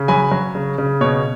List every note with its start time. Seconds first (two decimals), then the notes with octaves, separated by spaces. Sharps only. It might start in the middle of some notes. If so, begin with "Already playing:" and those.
Already playing: C#3
0.08 F#3 G#5 B5
0.31 F#3
0.55 C#3
0.78 C#3
1.01 B2 C#5